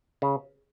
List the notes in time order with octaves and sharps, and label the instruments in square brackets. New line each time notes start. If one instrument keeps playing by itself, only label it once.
[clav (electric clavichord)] C#3